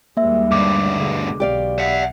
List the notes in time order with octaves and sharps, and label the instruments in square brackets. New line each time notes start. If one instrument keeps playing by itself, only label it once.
[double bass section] D#2 G3 G#3 [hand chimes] A#3 E5
[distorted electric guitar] D2 G2 [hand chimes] D6
[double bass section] B2 D3 G#3
[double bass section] B1 [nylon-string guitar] G4 D5 F5
[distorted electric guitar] E5 F#5